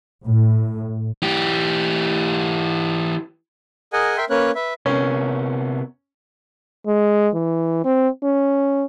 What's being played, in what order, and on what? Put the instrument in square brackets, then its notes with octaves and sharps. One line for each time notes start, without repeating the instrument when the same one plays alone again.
[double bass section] A2
[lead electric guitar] E3 G4
[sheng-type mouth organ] G#4 A#4 D#5 F#5 G#5
A#4 E5 G5 C6
A#3 C#4 A#4 B4 C#5 F#6
B4 E5
[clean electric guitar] C3 B3 A#4 [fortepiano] C#4
[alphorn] G#3
E3
C4
C#4